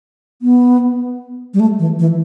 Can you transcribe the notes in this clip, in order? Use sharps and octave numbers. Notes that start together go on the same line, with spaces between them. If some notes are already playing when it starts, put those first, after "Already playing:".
B3
G3
A3
E3
E3